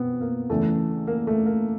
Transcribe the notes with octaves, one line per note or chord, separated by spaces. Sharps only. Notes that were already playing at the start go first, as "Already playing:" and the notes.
Already playing: B2 B3 C4
A#3
E2 C#3 E3 A3
A#3
A3
A#3